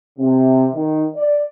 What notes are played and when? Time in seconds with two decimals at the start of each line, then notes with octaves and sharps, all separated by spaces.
0.18 C3
0.73 D#3
1.15 D5